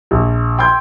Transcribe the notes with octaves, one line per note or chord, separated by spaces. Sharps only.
A#1
G5 C6 E6 G6 G#6